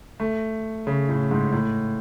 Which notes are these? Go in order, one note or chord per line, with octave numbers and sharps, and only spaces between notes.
A3
C#3
A2
G#2
A2